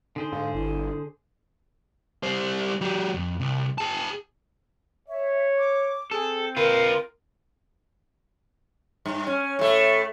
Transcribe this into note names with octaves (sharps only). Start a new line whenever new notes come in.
D3 D#4 G#4 C5
G#2 F5
G1 E4
G3 C5
F#3 G4
F2
C2
G#4 A5
C#5 E5
D6
C4 G#4 A4
F4 A#4 B4
G2
C#4
A2 A3